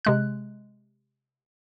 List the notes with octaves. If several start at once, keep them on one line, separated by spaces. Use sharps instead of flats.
C3 G#3 F#6